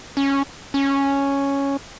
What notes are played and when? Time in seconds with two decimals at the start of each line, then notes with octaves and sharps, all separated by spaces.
0.17 C#4
0.74 C#4